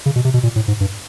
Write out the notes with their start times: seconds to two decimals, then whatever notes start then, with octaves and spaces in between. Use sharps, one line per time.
0.06 C#3
0.16 B2
0.25 C3
0.34 B2
0.43 A#2
0.56 A2
0.68 G#2
0.80 G2